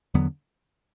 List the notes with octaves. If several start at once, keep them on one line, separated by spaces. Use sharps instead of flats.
E2 D3 F#3 B3